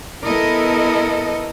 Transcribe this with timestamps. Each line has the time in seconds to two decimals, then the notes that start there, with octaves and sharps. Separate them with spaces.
0.24 B3 E4 A4 A#4 D#5